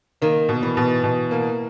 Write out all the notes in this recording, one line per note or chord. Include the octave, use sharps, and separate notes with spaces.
D#3 A#3
B2
E3
B2
B2
A#3